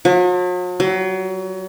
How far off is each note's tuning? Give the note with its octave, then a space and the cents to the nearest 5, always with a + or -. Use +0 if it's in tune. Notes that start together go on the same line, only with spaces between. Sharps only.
F#3 -45
F#3 +30